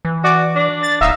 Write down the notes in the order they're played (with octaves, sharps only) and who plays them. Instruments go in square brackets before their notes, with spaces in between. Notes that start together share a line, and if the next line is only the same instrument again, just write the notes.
[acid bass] E3
[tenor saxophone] F#4 [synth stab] D5
[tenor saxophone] D4
[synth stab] A6
[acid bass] D1 [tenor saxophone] D#4 [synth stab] E5 F5